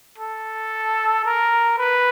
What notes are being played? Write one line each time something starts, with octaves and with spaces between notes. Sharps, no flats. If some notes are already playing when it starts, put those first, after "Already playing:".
A4
A#4
B4